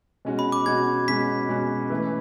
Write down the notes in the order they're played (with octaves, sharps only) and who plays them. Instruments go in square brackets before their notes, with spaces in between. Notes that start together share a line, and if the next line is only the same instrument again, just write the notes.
[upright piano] B2 G#3 C#4 F#4
[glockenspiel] B5
D6
[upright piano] B2 G#3 C#4 F#4 [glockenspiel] G#6
[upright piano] B2 G#3 C#4 F#4 [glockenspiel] B6
[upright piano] B2 G#3 C#4 F#4
E3 A3 C#4